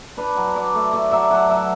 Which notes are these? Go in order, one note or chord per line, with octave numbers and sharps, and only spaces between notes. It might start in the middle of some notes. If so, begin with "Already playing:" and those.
D4 B4
F#3
F#3 D5
A3
A3 D5
F#3 E5
F#3 F#5
F#3 E5